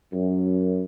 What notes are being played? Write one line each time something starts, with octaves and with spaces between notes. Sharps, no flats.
F#2